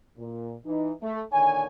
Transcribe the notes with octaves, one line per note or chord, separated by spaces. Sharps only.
A#2
E3 D#4
A3
A#2 D3 D#3 C#5 G#5